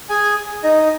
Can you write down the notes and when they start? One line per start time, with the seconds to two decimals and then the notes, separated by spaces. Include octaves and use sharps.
0.09 G#4 G#5
0.64 D#4 D#5